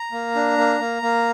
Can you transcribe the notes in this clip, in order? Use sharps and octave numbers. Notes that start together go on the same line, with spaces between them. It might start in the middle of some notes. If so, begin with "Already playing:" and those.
Already playing: A#5
A#3
D4
A#3
A#3
A#3